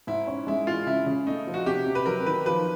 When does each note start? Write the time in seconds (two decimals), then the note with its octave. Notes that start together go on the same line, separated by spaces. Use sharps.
0.07 G#2 E4
0.27 C#4
0.47 G#3 E4
0.67 E3 F4
0.86 C#3 E4
1.06 C#3
1.27 A3 D#4
1.47 F3
1.54 F#4
1.66 C3 G4
1.86 C3
1.95 B4
2.06 F#3 A#4
2.27 D#3 B4
2.46 F3 B4